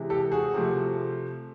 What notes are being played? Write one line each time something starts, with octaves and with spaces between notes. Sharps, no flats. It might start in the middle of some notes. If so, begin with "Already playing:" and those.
Already playing: C3 E3 G#3
G4 A4
F#4 G#4
C3 F3 A3